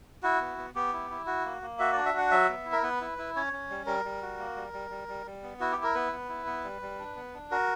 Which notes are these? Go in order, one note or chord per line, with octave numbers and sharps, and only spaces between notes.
E4 F#4
B3
B3
B3 G4
E4
E4
F#4
A#3
A#3
F#4 E5
D4 D5
E5
F#4 F#5
F#3 E5
B3
E4
A#4
B3 B4
E4
E4
C#4 C#5
C#4
G3
G3 A#4
G3
F#4
A#3
G3
G3
G3
G3
G3
B3
E4 F#4
G4
E4
A#4
B3 B4
B3
E4
B3
G3
G3
D4
B3
D4
F#4 A#4